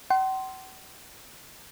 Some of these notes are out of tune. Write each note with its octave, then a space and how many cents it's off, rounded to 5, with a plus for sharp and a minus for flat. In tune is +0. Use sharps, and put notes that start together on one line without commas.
F#5 +45 C6 +0